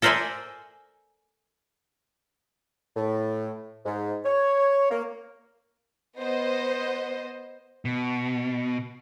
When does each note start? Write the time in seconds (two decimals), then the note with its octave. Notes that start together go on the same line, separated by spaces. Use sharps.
0.02 A4 A#4 C5 D5 E5 G#5
2.96 A2
3.86 G#2
4.25 C#5
4.90 A#3
6.18 B3 C5 D#5
7.85 B2